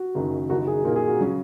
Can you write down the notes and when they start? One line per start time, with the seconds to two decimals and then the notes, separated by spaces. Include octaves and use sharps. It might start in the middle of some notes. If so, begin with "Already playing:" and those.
Already playing: F#4
0.15 F#1 F#2 D#3
0.50 F#1 F#2 D#3 F#4
0.67 G#4
0.84 A#2 A#3 D#4 A#4
0.96 G#4
1.08 F#4
1.20 C#3 F#3 C#4